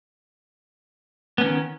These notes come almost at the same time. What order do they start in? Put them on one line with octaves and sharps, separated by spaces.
B3 C#4 D#3